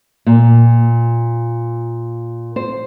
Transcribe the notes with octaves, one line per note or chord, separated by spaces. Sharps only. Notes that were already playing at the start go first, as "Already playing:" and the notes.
A#2
C5